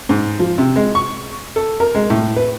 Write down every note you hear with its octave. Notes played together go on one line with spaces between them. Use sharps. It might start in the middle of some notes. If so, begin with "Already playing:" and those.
G#2
F3
C3
G#3
C#6
A4
A#4
G#3
A2
B4